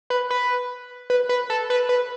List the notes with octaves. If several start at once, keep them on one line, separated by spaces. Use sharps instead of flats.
B4
B4
B4
B4
A4
B4
B4